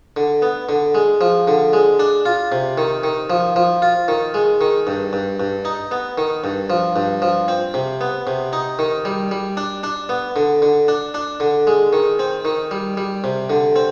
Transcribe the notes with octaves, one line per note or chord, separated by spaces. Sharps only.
D3
B3
D3
G#3
F3
D3
G#3
D4
F4
C3
D#3
D#3
F3
F3
F4
D#3
G#3
D#3
G2
G2
G2
D#4
B3
D#3
G2
F3
G2
F3
C4
C3
B3
C3
D#4
D#3
G3
G3
D4
D4
B3
D3
D3
D4
D4
D3
G#3
D#3
C4
D#3
G3
G3
C3
D3
C4